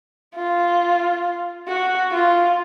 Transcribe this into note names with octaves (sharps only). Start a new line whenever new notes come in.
F4
F#4
F4